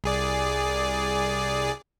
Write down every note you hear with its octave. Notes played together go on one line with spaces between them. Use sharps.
C2 G#4 D5